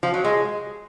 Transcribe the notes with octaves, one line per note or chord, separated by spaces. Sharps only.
F3
F#3
G#3